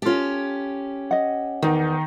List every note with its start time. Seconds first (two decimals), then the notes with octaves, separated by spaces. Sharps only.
0.02 C#4 F4 G4 A4
1.11 D#5 F#5
1.62 E2 D#3 D#4